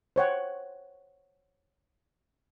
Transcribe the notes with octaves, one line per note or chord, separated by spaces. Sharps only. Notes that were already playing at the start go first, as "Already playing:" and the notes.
C5 C#5 F#5 G5